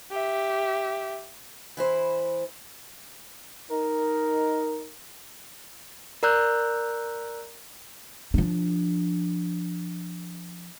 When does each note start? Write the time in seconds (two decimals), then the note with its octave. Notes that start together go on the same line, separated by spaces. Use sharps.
0.11 G4 E5
1.77 E3 E4 C5
3.71 D#4 A#4
6.23 A#4 D5 A#5 E6 F#6 G6
8.34 F3 D4